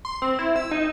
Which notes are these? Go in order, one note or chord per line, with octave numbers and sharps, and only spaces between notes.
C6
C4
E4
E6
D#4